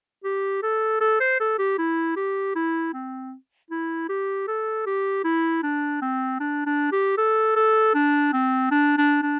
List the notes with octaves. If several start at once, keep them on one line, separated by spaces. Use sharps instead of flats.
G4
A4
A4
C5
A4
G4
E4
G4
E4
C4
E4
G4
A4
G4
E4
D4
C4
D4
D4
G4
A4
A4
D4
C4
D4
D4
D4